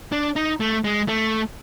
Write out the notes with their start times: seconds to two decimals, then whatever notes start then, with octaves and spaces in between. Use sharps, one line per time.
0.12 D4
0.36 D#4
0.60 A3
0.84 G#3
1.08 A3